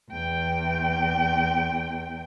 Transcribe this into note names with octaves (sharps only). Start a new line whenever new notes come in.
E2 G5